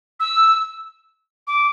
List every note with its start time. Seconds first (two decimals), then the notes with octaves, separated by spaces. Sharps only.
0.20 E6
1.47 D6